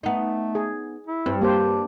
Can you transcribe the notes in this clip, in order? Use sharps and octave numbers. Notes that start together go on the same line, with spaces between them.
A3 B3 D#4
G#4
E4
G2 C4
A#3 D4 G4 C5